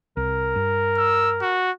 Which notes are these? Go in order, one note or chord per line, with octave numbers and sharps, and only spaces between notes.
C2 A#4
G2
E6
F#4